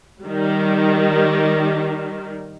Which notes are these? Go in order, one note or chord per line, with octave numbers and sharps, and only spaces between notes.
D#3 G3